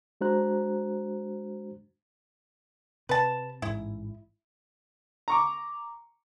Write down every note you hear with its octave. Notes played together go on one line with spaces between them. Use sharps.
G#3 D4 F#4 C5 A#5 F#6
C3 B4 A5
A1 G#2 E4
A#5 C#6 D6